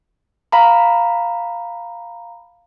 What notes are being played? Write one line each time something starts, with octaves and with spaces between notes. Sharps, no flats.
F5 A#5 B5